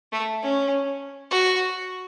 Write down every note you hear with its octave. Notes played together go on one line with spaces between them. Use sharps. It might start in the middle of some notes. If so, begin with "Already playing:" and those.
A3
C#4
F#4